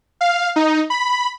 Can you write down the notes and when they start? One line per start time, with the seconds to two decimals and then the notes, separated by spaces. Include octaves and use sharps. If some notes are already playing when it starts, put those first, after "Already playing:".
0.21 F5
0.56 D#4
0.90 B5